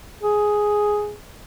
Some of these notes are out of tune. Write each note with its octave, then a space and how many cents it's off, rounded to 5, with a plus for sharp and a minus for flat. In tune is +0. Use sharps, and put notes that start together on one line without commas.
G#4 +5